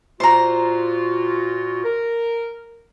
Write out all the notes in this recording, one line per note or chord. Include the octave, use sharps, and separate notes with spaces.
A#2 F4 F#4 C5 A#5
A#4